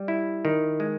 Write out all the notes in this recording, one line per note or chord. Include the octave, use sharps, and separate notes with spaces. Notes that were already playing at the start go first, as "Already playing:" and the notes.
Already playing: G3
E4
D#3
G#3